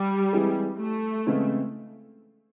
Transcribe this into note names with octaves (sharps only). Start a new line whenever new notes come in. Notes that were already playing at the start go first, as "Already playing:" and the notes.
Already playing: G3
E3 G#3 C4 E4 G#4
A3
C#3 E3 G#3 C4 E4